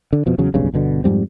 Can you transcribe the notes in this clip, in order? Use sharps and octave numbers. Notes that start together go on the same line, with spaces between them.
D3
F2 B2 F3
E2 C#3 F#3
F1 B1 G2 C#3
G1 B2 D3
F2 G#2 G3 C4